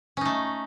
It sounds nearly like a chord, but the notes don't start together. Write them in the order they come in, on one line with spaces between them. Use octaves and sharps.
C#4 D#4 A3